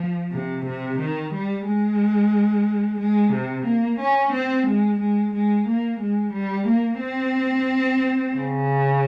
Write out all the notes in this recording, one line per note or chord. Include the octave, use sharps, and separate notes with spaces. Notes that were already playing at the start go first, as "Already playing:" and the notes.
Already playing: F3
C3
C3
D#3
G3
G#3
G#3
C3
A#3
C#4
C4
G#3
G#3
G#3
A#3
G#3
G3
A#3
C4
C#3